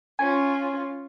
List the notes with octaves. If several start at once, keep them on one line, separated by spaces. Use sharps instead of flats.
C#4 F4 G#5